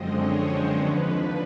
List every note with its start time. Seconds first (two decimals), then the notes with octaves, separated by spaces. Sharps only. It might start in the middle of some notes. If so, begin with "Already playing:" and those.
Already playing: F#2 D3 F3 G#3 C4 D#5
0.15 C#5
0.43 C5
0.73 D#2 D3 F3 B4